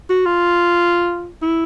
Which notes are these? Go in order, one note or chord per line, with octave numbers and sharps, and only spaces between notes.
F#4
F4
E4